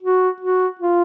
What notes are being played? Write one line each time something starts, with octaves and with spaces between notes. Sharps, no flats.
F#4
F#4
F4